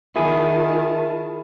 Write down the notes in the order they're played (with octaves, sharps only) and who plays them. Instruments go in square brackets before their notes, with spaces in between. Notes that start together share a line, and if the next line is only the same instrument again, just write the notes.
[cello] D#3 [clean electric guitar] E4 G#4 [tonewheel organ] F4 A#4 A5